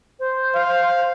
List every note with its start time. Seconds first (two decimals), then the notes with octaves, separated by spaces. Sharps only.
0.20 C5
0.55 F5